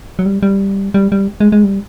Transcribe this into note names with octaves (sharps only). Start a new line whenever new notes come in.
F#3
G3
G3
G3
G3
G#3
G#3
G3